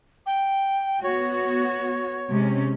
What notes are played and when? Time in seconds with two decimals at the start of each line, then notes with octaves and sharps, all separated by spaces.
0.26 G5
1.03 B3 F#4 C#5
2.29 C3 G#3 C#4